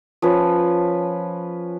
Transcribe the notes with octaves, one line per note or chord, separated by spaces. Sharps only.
F3 C#4 B4